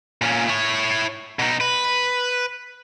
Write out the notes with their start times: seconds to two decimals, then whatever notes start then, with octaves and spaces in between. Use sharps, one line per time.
0.22 A#2 C#4
0.48 E4 C#5
1.39 B2 D#4
1.61 B4